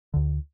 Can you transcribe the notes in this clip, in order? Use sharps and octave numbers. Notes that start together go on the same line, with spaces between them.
D2 D3